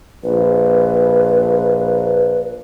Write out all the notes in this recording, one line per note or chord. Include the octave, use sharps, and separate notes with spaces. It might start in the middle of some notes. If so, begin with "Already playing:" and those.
A#1 B4